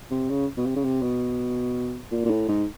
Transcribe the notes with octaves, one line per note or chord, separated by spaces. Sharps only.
C3
C#3
B2
C3
C#3
C3
B2
A#2
A#2
A2
G#2